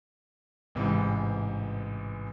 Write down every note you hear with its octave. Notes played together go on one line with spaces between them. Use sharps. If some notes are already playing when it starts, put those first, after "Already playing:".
A1 G#2 C3 E3